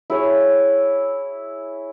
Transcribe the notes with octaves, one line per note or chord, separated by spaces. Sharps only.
E4 G#4 C#5